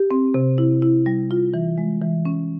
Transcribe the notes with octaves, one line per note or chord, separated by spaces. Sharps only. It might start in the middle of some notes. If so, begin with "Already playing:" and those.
Already playing: G4
C4
C3
E4
E4
G3
F4
E3
G#3
E3
C#4